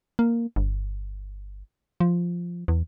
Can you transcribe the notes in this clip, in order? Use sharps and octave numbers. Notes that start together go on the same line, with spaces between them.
A#3
G1
F3
E2